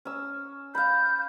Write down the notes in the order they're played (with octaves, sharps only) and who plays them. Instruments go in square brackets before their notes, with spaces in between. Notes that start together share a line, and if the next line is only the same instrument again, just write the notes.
[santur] C#4 E6
[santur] F5 B5 [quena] G6